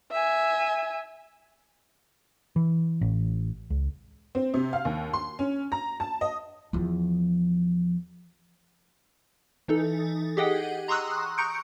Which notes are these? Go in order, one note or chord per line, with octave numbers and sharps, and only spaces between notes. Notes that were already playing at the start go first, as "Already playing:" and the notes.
E5 G#5
E3
A1
C#2
C4
C3
F5
D#2
C6
C#4
A#5
A5
D#5
E2 F3
E3 D#4 A4
G4 G#4 D#5 F#5 G5
A#5 C6 C#6 D#6 E6 F#6
A#5 C#6 G6 C#7 D7